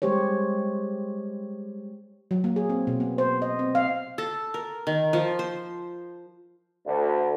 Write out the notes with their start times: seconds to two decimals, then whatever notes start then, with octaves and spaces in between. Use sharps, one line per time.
0.02 G3 G#3 G4 C5 C#5
2.31 F#3
2.44 A#3
2.56 G#4
2.70 C4
2.87 B2
3.00 B3
3.18 C5
3.42 D#5
3.59 C4
3.75 F5
4.18 A4
4.54 A#4
4.87 D#3
5.13 F3
5.39 C5
6.85 D2